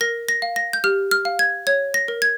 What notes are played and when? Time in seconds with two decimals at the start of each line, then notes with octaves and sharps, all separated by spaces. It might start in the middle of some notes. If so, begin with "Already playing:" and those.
0.01 A#4 A#6
0.29 A#6
0.42 F5
0.56 A#6
0.73 G6
0.84 G4 F6
1.11 F6
1.25 F5
1.39 G#6
1.67 C#5 G#6
1.94 A#6
2.08 A#4
2.22 G#6